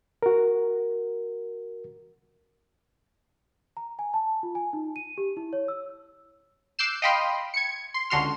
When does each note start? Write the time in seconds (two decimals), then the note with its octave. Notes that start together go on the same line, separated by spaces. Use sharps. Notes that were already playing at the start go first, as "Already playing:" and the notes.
0.23 F#4 A#4
3.77 A#5
3.99 G#5
4.14 A5
4.43 F4
4.55 G#5
4.73 D#4
4.96 D#7
5.18 G4
5.37 E4
5.53 C#5
5.68 E6
6.79 D6 E6 F#6 G6 C7 E7
7.02 D#5 F5 G5 B5 C6 F6
7.54 G#6 C#7
7.94 C6
8.10 C#2 D3 F#4 C6 F6